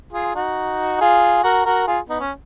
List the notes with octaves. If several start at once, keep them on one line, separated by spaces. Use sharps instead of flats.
F4 G#4
D#4 F#4
F4 G#4
F#4 A#4
F#4 A#4
F4 G#4
B3 D#4
C#4